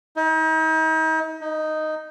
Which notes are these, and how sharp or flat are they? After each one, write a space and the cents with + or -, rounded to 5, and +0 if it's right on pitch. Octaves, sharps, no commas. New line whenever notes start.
D#4 +40
D#4 -5